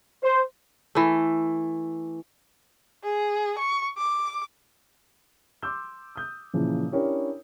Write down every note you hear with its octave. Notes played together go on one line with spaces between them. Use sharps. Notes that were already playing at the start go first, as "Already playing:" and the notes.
C5
E3 A3
G#4
C#6
D6
C6 D6 E6 G6
D#6 G6
A#2 C#3 E3 F3
C#4 D4 E4 G4 A#4 C#5